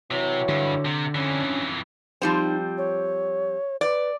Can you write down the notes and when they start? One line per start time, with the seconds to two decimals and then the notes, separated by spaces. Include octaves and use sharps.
0.11 C3 E3 F#3 C#5
0.49 G2 D3
0.85 C3
1.15 F2 E3 C#4 D4
2.22 F3 G3 C4 D#4
2.78 C#5
3.81 B4 D5